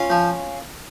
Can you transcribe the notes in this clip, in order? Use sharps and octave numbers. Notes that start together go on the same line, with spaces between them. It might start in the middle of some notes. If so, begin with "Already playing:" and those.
Already playing: C#4 F4
F3